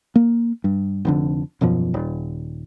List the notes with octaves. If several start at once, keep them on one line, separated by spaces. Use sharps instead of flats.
A#3
G2
F1 F2 D3
D#1 F#2 B2 F3
D#1